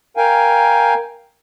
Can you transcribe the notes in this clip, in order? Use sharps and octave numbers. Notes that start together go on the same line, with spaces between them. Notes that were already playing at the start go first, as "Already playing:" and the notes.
A#4 F5 G5 G#5